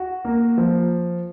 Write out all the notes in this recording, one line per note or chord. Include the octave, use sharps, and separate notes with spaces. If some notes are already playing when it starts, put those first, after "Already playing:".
Already playing: F#4
A#3
F3